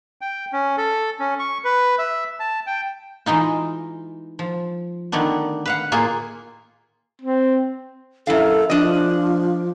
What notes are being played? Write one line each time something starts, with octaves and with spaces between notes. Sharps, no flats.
G5
C#4
A4
C#4
C#6
B4
E5
A5
G5
E3 G#3 D#4 F4
F3
D3 D#3 A3 B3 D4
B4 F5 F#5
A2 A#3 F4 G#4
C4
F#2 E4 A4 F5
F3 D4 D#5